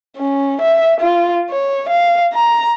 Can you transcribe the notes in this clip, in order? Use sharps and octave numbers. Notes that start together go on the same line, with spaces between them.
C#4
E5
F4
C#5
F5
A#5